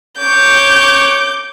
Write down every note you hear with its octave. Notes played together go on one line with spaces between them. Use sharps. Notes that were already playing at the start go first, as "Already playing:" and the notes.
C#5 D6 G6